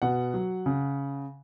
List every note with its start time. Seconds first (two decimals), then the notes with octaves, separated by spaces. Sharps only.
0.02 B2 F#5
0.34 F#3
0.66 C#3